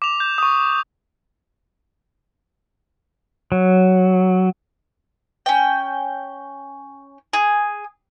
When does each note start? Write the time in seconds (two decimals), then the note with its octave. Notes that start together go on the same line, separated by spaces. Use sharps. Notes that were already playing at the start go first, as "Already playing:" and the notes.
0.02 D6 F7
0.20 G6
0.38 C#6 D#6
3.52 F#3
5.46 C#4 G5
7.33 G#4